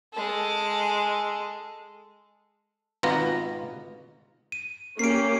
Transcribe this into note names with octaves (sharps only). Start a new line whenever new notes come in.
G#3 A4
G#1 B2 B3 F4 A#5
D#7
A#3 C#4 G4 C7 D7